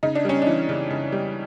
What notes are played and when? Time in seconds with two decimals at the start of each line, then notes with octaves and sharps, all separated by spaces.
0.03 C#3 D#4
0.15 D4
0.25 G3 C#4
0.42 D4
0.47 E3
0.69 C#3
0.90 C#3
1.12 G3